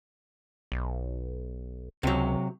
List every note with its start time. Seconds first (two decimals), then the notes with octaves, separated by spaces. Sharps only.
0.72 B1
2.03 C#2 C3 F#3